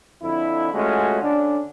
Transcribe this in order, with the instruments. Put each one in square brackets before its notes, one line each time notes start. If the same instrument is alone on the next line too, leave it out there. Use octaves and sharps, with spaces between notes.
[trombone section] F2 D3 E4
G#3 A3 C#4 F4 F#4
D3 C#4 D4